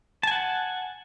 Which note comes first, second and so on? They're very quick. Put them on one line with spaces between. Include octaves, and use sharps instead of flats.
A5 G#5 F#5